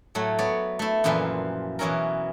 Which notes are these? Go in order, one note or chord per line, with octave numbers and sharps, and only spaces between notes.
A2 F#3 A3
B3 C#5 D5
A3 E4
F#2 A#2 E3 F3 B4 C5
B2 E3 F#3 C#4 E4 A#4